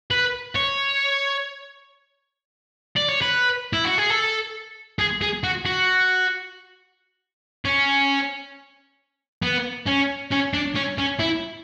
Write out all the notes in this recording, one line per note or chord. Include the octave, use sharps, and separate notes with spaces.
B4
C#5
D5
C#5
B4
E4
F#4
G#4
A4
G#4
G#4
F#4
F#4
C#4
B3
C#4
C#4
D4
C#4
C#4
E4